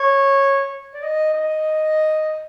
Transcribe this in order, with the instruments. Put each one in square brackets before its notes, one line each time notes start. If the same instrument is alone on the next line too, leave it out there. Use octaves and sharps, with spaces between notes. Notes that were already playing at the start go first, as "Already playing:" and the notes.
Already playing: [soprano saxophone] C#5
D5
D#5
D#5